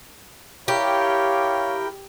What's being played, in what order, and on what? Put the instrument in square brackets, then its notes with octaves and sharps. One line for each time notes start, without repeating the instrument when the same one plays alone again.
[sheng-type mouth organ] E4 A#4 G5 [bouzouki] G4 [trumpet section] C#5 F5